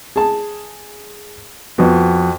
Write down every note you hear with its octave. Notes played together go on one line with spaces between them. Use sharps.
G#4 A5
F2 B3 F#4